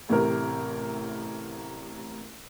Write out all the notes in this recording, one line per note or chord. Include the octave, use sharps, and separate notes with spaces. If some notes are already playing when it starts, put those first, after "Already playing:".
A1 A2 C3 A#4